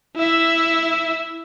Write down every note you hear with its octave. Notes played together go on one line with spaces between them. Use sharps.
E4 E5